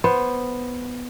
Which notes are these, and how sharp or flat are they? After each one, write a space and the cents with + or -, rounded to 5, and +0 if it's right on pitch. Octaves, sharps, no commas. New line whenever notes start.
B3 +0 C5 +0